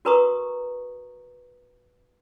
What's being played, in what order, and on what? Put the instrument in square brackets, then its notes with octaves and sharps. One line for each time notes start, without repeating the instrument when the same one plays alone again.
[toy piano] F#4 A#4 B4 A#5 C#6 D#6